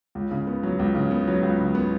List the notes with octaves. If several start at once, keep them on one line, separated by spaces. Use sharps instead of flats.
C#2
C#3
B3
F#3
C#2
C#3
B3
F#3
C#2
C#3
B3